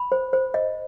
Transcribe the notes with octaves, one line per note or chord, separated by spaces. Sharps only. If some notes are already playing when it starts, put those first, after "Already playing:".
Already playing: B5
C5
C5
D#5